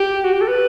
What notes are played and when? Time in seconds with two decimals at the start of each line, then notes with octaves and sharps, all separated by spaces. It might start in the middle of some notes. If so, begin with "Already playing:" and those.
Already playing: G4
0.24 F#4
0.33 G4
0.41 A4
0.48 B4